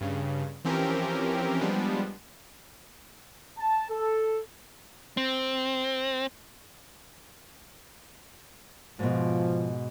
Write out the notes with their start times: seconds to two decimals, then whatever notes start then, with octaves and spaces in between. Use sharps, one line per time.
0.01 G2 C#3
0.64 E3 F3 C4 C#4 G4 A#4
1.60 F3 G3 G#3 B3 D4
3.58 A5
3.90 A4
5.17 C4
8.99 G#2 B2 F3